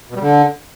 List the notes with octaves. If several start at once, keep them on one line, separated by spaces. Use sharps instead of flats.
B2
G3
D3